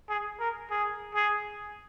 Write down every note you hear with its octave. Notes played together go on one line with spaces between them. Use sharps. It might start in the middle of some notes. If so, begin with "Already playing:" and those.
G#4
A#4
G#4
G#4